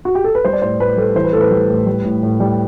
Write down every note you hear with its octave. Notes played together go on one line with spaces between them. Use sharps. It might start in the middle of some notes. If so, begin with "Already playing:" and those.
F#4
G4
A4
B4
G3 C5
D5
A2 C5
A2 B4
G3 A4
E3 C5
B4
A2 A4
B4
G3
A2
G3
A2
A2
G3